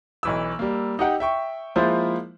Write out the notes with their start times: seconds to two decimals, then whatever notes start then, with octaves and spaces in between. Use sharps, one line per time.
0.23 B1 E3 E6
0.59 G3 A#3
0.99 D#4 G4 F#5 G5
1.20 E5 G5 C#6
1.76 F3 G#3 A#3 E4 F4 C5